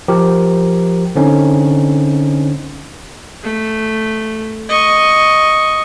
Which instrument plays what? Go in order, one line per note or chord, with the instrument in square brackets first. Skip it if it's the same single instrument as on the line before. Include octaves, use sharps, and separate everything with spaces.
[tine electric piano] F3 G4 A#4
D3 C4 C#4 D#4
[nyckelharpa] A3
D#5 C#6